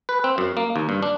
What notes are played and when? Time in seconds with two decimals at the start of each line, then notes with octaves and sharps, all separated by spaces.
0.09 B4
0.24 C4
0.38 F#2
0.57 A#3
0.76 D#2
0.89 G2
1.03 D4